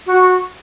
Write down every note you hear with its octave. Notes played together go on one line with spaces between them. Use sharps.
F#4